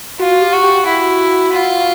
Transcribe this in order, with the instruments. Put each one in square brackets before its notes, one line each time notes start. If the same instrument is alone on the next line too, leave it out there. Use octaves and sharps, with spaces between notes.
[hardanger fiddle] F4 [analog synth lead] F#4
[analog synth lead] F#4
G4
[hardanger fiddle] F#4
[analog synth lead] G4
[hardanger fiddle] E4 [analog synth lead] F#4
[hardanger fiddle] F4